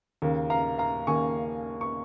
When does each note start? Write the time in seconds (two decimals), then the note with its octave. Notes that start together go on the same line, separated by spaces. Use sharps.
0.22 D#2 C#3 A#3
0.50 F5 A#5
0.78 F5 A#5
1.07 D#2 C#3 A#3 G#5 C#6
1.81 C#6